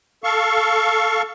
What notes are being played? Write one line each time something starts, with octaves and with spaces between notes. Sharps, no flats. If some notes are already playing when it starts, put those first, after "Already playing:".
A4 F5 C#6